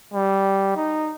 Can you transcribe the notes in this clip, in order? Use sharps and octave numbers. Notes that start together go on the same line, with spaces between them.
G3
D#4